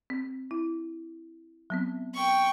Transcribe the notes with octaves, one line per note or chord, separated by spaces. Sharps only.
C4
E4
F#3 B3 C4
G5 C#6